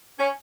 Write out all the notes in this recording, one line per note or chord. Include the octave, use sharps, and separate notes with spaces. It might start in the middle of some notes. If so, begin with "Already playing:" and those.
C#4